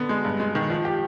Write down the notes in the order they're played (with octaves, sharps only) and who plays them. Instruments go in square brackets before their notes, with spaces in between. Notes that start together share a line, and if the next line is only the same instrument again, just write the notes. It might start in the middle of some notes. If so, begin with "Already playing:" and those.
Already playing: [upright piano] D3 B3
G#3
G2
G#3
D#3
F3
G4